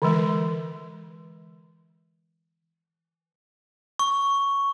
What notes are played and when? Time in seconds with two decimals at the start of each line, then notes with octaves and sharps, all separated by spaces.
0.02 D3 E3 G#3
3.99 C#6